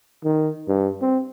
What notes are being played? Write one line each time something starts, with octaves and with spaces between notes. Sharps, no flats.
D#3
G2
C4